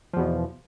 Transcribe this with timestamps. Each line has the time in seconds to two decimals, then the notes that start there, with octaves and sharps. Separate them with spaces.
0.13 F3
0.16 E2
0.19 B2